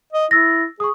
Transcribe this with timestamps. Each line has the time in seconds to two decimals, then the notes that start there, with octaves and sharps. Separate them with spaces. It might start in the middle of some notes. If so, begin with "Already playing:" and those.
0.13 D#5
0.31 E4 E6 A6 A#6
0.80 G#4 C#6 D#6